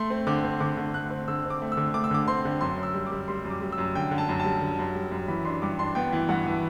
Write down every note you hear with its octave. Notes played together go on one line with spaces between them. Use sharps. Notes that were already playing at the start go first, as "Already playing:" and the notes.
Already playing: A3 C6
C4
D3 D6
C4
D3 D6
D3
A3 F#6
C4
D3 E6
C4
D6
A3
E6
D3
A3 D6
E6
D3 D6
C4 C6
D3
F#2 C6
F#2
E6
G3
D6
G3
G3 C6
F#2
D6
G3
E6
F#2
D3 G5
D3
A5
F#2
A5
G3
D3
F#2
G3
F#2
E3 B5
D4 C6
G2 D6
D4 C6
B3 G5
E3
G2 F#5
E3